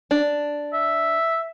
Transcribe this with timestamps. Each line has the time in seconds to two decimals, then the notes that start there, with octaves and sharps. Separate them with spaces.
0.11 D4
0.73 E5